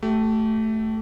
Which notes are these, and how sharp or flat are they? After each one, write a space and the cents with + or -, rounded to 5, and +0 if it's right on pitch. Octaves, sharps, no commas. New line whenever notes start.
A3 +0 G4 -35